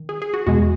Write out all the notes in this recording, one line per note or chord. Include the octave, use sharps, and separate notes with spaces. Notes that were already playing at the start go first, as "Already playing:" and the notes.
Already playing: D#3
G#4
G#4
F#4
E2 B2 G#3 F#4